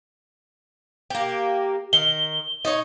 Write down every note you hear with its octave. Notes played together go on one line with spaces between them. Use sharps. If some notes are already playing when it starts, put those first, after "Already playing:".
A#3 G4
D#3 G7
D#4 C#5